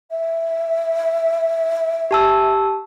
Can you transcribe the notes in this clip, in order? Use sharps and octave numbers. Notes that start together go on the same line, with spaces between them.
E5
G4 A5 E6